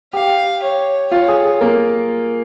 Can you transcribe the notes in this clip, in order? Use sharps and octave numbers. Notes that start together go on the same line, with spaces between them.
G4 F5 G5
C#5
F4 C#5 F5
G#4
G#4
A#3 A#4